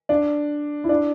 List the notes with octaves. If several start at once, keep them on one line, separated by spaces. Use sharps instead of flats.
D4
E4
D4